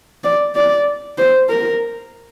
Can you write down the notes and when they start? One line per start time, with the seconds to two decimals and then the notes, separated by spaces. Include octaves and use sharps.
0.24 D5
0.55 D5
1.18 C5
1.49 A#4